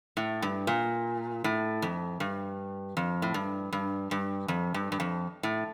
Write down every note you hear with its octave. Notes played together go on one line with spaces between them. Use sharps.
A2
G2
A#2
A2
F2
G2
F2
A2
G2
G2
G2
F2
G2
G2
F2
A2